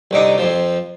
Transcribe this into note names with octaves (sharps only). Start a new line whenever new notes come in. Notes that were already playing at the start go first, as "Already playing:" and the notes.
C2 D3 D#4
F2 F3